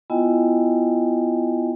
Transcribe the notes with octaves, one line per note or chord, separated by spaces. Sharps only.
B3 E4 F4 D#5 G5 G#5